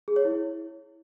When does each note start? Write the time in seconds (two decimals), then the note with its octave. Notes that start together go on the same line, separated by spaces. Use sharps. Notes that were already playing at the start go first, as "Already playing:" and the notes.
0.08 G#4
0.16 C#5
0.25 E4